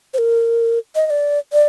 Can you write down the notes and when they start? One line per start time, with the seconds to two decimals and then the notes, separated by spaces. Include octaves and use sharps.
0.14 C5
0.18 A#4
0.95 D#5
1.06 D#5
1.10 D5
1.53 D5